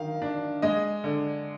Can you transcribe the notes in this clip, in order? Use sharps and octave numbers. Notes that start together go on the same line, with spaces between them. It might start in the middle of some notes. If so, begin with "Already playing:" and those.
Already playing: D#3 F5
D4
G#3 D#5
D3